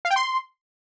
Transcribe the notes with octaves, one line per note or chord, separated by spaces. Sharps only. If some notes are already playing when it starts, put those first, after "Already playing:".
F5
G5
C6